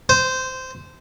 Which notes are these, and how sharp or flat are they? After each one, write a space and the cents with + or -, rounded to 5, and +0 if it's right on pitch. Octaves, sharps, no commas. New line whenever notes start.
C5 -15